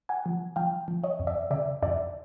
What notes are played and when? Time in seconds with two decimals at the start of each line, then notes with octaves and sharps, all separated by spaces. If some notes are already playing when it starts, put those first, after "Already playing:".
0.09 F#5 G#5
0.26 F3
0.56 F3 F5 G5
0.88 F3
1.04 C#5 D#5
1.19 F2
1.27 D5 E5
1.50 C#3 D5 E5
1.82 F2 D5 E5